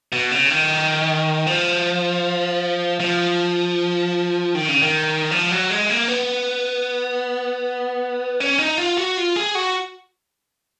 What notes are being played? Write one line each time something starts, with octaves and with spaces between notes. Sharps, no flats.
B2
C#3
D#3
F3
F3
D#3
C#3
D#3
F3
F#3
G#3
A#3
B3
C#4
D#4
F4
F#4
F4
G#4
F#4